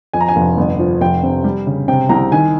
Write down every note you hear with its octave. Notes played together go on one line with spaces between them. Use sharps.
F2 G#5
A#5
G#5
F1
G1
F3
F1 G5
C3
G3
C#3
C3 G5
C2 A#5
D#3 G#5